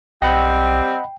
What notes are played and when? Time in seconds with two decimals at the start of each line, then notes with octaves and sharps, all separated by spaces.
0.22 B1 G3 C4 D#5 F#5 G5 B5